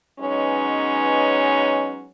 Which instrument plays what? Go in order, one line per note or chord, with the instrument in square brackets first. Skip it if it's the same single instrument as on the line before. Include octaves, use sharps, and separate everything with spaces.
[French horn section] F#3 G#3 B3 C#4 D#4 B4